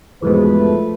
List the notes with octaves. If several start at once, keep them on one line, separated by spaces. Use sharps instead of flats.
E2 G#2 B2 F3 A3 B4